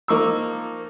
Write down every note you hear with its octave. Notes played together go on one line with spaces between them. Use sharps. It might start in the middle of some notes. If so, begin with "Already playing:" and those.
F3 A#3 D#4 C#6 D6 E6